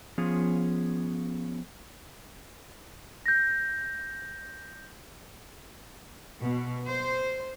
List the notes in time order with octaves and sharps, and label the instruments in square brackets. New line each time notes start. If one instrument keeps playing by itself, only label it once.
[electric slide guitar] F3 B3 C#4 F4 G#4
[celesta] G6 A#6
[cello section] B2
C5